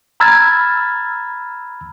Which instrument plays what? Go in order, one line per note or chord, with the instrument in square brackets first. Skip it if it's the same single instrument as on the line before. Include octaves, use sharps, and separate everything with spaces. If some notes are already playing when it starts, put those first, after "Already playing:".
[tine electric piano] A#5 B5 E6 F6 G#6 A6